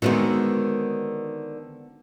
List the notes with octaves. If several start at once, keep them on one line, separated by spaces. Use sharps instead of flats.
D3 D#3 G#3 B3 C4 F#4